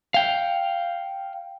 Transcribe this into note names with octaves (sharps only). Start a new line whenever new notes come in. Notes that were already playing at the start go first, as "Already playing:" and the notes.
F5 G5